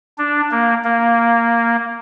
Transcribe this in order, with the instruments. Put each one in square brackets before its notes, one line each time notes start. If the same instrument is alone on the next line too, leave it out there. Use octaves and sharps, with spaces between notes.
[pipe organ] D4
A#3
A#3